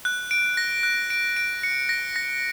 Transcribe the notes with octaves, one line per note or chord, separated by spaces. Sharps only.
F#6
D7
A#6
F#6
D7
D7
C#7
A#6
A#6